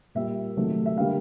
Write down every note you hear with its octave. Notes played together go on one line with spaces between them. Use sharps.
A#2 G3 A#3 E5
C3 D#3 F#3 A3
E5
D3 G3 A#3 F5